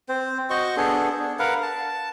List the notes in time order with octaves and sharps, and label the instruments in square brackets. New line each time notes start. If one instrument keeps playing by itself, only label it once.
[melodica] C4 C5
F#4 C5 D#5 C#6
B3 D4 G#4 A4
D4
A#4 B4 F5 F#5
A5